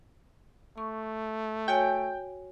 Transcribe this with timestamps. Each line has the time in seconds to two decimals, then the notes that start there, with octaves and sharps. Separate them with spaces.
0.78 A3 C#6
1.68 F#4 C#5 G5 G#5